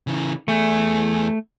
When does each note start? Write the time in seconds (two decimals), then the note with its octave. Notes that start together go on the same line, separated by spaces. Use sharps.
0.07 C#3 E3
0.48 E2 A3 G#4